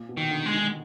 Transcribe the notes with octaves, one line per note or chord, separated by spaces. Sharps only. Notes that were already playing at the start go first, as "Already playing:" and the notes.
Already playing: A#2
B2
D#3
D3
G#3
D#3